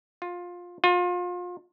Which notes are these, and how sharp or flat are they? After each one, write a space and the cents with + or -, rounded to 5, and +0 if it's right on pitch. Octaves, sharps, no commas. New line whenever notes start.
F4 +15
F4 +30